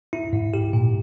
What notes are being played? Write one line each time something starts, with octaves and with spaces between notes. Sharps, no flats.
E4
G#2
G4
A#2